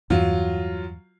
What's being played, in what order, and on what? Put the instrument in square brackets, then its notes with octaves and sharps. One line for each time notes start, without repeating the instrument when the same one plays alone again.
[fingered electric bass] E2 G2 E3 [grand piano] F#3 F4